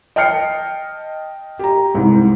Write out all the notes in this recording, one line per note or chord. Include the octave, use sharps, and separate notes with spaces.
D#5 G5 A5 F6 C7 C#7
G4 A#5
C2 G#2